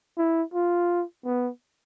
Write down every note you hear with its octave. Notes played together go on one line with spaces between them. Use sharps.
E4
F4
B3